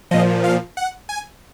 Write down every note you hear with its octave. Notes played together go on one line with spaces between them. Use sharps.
A#2 F3 D#5
F5
F#5
G#5